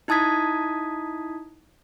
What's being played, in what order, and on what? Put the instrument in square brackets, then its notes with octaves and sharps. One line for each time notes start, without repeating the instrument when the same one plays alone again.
[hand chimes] D#4 E4 A5 D#6 G#6 B6